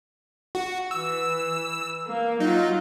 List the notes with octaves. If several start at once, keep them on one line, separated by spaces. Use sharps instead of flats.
F#4
E3 E6
A#3
F#3 D#4 F4